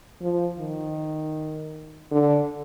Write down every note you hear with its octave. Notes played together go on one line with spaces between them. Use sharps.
F3
D#3
D3